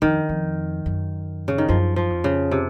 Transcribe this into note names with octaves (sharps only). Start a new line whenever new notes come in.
F2 D#3
F2
F#2
C#3
D#3
F#2 F3
F3
F2
C#3
C3